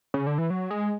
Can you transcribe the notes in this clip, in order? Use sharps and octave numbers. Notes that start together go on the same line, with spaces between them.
C#3
D3
E3
F#3
G#3